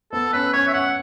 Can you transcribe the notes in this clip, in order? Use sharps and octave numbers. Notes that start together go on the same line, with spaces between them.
B3 A4
C#4 B4
C#4 C#5
E5
C#4 F#5